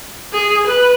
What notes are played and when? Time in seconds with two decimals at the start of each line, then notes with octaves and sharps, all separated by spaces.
0.33 G#4
0.66 B4